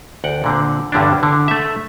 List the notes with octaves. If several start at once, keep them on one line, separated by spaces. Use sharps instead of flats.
D2 F#5 G5
A#2 D3 C4
E2 G2 D3 G3 C#4 D4
D3 E4
A3 E5